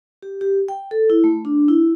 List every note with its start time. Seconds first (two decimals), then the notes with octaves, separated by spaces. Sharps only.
0.22 G4
0.41 G4
0.68 G5
0.91 A4
1.10 E4
1.24 A3
1.45 D4
1.69 E4